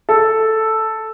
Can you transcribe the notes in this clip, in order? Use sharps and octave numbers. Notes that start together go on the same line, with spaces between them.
A4